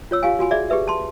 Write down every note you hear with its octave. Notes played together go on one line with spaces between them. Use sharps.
F4 C#5 E6
F4 G4 F5 G#5
F4 F#4 G#5 B5
G#4 D5 E5
G4 G#4 B4 E5
A5 C6